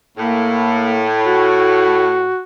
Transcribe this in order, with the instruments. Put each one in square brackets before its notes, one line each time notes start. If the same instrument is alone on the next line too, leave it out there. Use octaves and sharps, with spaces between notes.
[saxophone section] A2 [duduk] A#3
[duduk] F#4